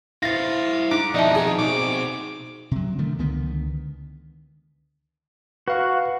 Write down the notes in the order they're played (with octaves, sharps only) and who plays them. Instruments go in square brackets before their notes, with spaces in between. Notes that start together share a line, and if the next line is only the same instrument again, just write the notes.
[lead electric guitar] E4 C5 [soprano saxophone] F5 [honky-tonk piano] A6 A#6
[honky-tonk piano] G#2 [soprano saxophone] D6
[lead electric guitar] F2 B2 [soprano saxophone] D#4 [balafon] D5 E5 A5
[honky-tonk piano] G#4
[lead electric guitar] B2 C4 [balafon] D#4 [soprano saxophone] D6
[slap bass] C3 F#3
D3 D#3 A3
C#2 D3 D#3 B3
[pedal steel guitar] F#4 [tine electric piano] B4 F5